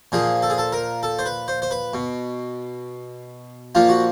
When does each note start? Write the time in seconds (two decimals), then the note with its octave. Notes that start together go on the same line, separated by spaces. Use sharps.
0.12 A#2 F3 G#4
0.43 A4
0.50 G#4
0.58 A4
0.72 A#4
1.03 A4
1.19 C5
1.26 B4
1.48 C5
1.62 C5
1.71 B4
1.94 B2
3.75 A#2 F3 F4
3.89 F#4